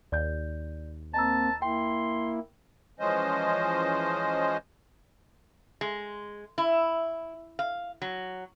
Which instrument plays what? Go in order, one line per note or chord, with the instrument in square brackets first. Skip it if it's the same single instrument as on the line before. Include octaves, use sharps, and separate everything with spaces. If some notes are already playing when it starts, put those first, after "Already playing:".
[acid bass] D#2 [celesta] D5 G6
[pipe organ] A#3 C4 [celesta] D#5 A#5 E6 [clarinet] A5
[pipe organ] A#3 E4 [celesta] G5 [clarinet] C6
[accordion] E3 F3 G#3 C#4 C5 D#5
[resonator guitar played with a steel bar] G#3
E4
F5
F#3